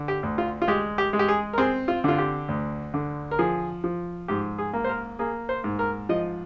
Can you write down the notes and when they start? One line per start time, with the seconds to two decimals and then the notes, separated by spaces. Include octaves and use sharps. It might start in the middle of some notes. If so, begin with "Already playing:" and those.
Already playing: D3
0.08 G4
0.23 D2
0.38 F4
0.62 F4
0.68 G#3 G4
0.98 G4
1.13 G#3
1.19 G4
1.28 G#4
1.53 A#4
1.58 C4 G#4
1.88 F4
2.04 D3 F4
2.18 G4
2.49 D2
2.94 D3
3.31 A#4
3.39 F3 G#4
3.84 F3
4.28 G#2 G4
4.58 G#4
4.73 A#3
4.84 C5
4.89 A#4
5.19 A#3 G#4
5.49 C5
5.64 G#2
5.79 A#4
6.09 F3 D#5